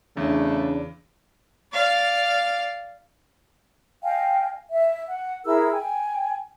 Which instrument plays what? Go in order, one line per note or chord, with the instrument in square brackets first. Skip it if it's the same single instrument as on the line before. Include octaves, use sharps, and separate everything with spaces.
[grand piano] E2 [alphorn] C#3 [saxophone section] A3 [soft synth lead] D4
[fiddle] D5 F5
[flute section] D#5 F5 G5 G#5
E5
F#5
E4 G#4 A#4 E6
G5 G#5